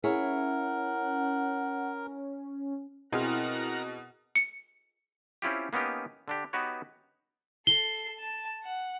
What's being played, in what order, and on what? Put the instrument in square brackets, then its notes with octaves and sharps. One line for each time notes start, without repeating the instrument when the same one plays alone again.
[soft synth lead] C#4 [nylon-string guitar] E4 G#4 C#5 [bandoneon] A#4 [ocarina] F#5
[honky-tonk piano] B2 [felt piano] C4 [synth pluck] E4 G#4 F6 [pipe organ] A#4 F#5 A#5
[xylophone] C#7
[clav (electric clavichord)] C4 C#4 E4 F4 G4
A#3 B3 C#4 D#4 G4
D3 D4 G4
B3 D#4 F#4 G4 B4 C#5
[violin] A4 C7 [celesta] G7
[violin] A5
F#5